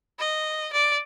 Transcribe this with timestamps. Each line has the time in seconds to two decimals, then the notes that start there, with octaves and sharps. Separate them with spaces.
0.19 D#5
0.73 D5